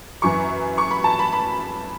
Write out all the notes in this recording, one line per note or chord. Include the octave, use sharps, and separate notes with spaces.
F#2 E3 C#6
C#6
B5
A5
B5
B5